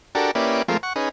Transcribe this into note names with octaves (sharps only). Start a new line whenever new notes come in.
D4 F#4 G4 A4 A#4
A#3 C#4 E4 G4 B4 D5
F3 G#3 A3 C4 F4 A#4
F#5 C#6
C#4 D#4 G#4 B4